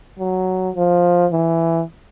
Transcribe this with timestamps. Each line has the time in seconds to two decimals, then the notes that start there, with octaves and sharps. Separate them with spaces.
0.19 F#3
0.76 F3
1.32 E3